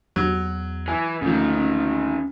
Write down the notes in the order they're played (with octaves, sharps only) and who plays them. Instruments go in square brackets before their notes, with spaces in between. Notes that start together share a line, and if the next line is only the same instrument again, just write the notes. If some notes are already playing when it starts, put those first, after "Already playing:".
[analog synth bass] E2 [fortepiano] F#3
[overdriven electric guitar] E3 [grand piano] G#5
[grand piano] D2 F3 [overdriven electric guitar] G#2 D#3 [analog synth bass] C#4
[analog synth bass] C#4